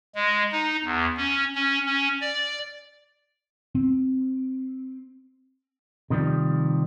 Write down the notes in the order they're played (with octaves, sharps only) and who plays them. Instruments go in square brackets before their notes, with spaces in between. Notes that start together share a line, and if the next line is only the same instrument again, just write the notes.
[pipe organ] G#3
D#4
E2
C#4
C#4
C#4
D5
[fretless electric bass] C4
[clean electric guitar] C3 D#3 F3 G3